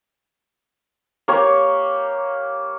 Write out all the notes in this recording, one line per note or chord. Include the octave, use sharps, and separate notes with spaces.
A#3 G4 C#5